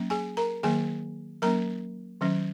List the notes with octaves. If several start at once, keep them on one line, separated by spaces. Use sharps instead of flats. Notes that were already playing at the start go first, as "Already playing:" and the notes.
Already playing: F#3 A#3 C#4
G#4 G#5
A#4 A#5
D#3 F#3 A#3 G#4 G#5
F#3 A#3 C#4 A#4 A#5
D#3 F#3 C#4